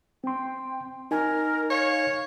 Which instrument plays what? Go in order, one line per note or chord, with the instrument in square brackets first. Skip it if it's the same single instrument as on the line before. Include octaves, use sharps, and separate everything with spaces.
[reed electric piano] C4 C6 [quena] G5
[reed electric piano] D#4 G#5 [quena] A#4
[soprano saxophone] C#5 [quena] F5